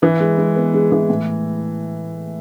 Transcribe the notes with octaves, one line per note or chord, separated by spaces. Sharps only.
E3 B4
G#3
G#3
B3
G#3
E3
A2